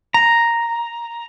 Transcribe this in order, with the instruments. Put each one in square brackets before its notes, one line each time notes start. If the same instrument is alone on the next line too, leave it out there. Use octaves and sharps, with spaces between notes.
[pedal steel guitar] A#5